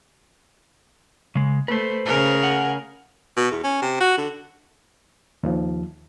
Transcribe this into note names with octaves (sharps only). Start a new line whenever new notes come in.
C#3 G#3
A3 B4 C5
C#3 G#4 A#4
F#5
B2
E2
C#4
C3
F#4
D3
D#2 F3